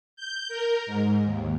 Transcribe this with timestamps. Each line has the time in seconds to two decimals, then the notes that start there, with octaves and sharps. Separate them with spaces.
0.16 G6
0.48 A#4
0.87 G#2
1.26 D#2